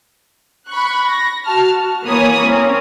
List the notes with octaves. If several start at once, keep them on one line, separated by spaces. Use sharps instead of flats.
B5 C#6 F#6
A#6
F#4 A5 F6
F#4
E3 A#3 C#5 G#5 B5 D#6
A#3 C4 C#4